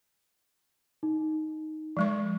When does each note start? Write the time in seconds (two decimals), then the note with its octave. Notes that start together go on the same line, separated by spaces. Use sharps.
1.03 D#4
1.97 F3 G#3 C#6